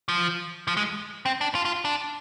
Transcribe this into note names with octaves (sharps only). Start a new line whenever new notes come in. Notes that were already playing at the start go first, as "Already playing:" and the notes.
F3
F3
G#3
C4
D4
F4
F4
D4